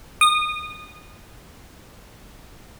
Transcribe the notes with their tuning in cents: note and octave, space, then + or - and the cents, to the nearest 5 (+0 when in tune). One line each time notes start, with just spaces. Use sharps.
D#6 -25